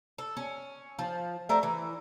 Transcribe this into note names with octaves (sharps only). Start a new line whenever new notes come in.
A4
C#4
F3
A3 C4 D4 A#4
E3